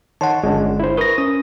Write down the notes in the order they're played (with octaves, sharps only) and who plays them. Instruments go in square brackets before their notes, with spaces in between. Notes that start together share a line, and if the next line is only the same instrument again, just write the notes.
[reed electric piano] D#3 C#5 C6 [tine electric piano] F#5 A5
[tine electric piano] G1 [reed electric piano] G#3 C#4 D4
[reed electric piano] E4 C5
[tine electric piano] A#4 A#6 [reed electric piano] B4 C#6 D#6
[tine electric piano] C#4 [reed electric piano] D#6